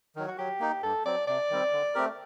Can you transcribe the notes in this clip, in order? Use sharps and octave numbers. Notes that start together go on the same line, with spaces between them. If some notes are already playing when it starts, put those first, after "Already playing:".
D#3 F#3
F#4
F#3 G4
A#3 D#4
G2 A4
F#3 C4 D5
C3 D5
D#3 G3 C4
D3
A3 C4 G4 A#4